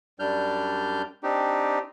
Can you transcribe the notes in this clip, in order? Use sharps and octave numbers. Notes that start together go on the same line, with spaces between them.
F#2 G3 D4 F6 G6
C4 D4 D#4 G4